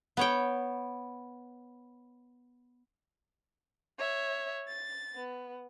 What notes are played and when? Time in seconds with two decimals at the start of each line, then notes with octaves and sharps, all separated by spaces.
0.17 B3 C#5 G5
3.99 C#5 E5
4.68 A6
5.15 B3